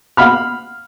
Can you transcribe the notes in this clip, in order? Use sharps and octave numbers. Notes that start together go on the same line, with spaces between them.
F5 F#5 B5 F6